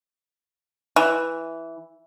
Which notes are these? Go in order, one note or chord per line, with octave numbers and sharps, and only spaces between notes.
E3